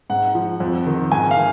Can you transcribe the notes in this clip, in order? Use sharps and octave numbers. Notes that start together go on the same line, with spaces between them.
G#2 F#5
F3
F2
D#3
G#2 G#5
F5
D#3